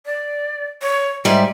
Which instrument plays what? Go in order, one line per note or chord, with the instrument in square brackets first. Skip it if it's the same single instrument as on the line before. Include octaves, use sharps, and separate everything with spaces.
[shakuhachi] D5
C#5
[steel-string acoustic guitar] G#2 G3 [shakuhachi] E5